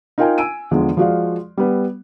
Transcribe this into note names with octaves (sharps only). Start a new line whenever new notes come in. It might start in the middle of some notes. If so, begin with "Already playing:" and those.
D#4 F4 A#4 F5 G5 G#5
G#5 E6 D7 D#7
E2 D3 F3 G#3
F3 G#3 F#4 D5 F5
G3 B3